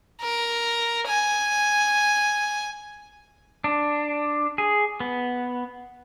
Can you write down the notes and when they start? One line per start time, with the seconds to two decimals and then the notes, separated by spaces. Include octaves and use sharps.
0.22 A#4
1.08 G#5
3.64 D4
4.58 G#4
5.00 B3